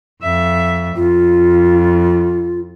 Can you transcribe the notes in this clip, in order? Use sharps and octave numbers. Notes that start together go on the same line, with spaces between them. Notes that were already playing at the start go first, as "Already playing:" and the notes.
F2 E5
F2 F4